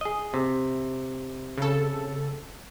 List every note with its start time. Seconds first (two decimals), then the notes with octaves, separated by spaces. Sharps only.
0.01 G#4 D#5
0.34 C3
1.58 C#3 A4